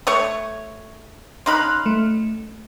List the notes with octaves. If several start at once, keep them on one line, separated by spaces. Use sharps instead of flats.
A3 C#5 C#6
C#3 D#4 B5 C6 F6 F#6
A3